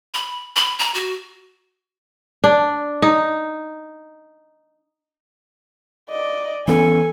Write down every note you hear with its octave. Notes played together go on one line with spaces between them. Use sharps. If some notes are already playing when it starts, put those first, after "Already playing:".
B5
B5
A#5
F#4
D4
D#4
D5 D#5
E3 B3 C#4 A4 G#5